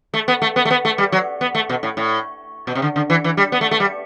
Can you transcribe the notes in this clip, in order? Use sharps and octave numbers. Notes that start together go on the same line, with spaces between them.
A3
B3
A3
B3
A3
B3
A3
G3
F#3
B3
A3
B2
A2
A2
B2
C3
D3
D3
E3
E3
G3
B3
A3
A3
G3